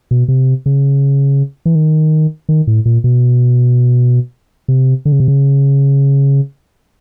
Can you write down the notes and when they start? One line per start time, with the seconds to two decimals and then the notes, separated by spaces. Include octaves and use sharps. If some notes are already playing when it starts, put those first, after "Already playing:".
0.11 B2
0.28 C3
0.66 C#3
1.66 E3
1.75 D#3
2.49 D#3
2.67 A2
2.85 A#2
3.04 B2
4.68 C3
5.05 D3
5.12 C#3
5.20 C3
5.28 C#3